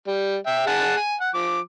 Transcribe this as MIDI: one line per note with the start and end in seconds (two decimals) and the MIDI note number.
0.07 0.36 55
0.47 0.66 76
0.47 0.66 79
0.67 0.94 68
0.67 0.94 78
0.67 0.94 81
0.97 1.14 80
1.21 1.30 78
1.34 1.60 53
1.34 1.60 86